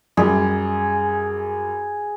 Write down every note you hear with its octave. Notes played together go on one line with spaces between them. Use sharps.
F#2 G3 G#4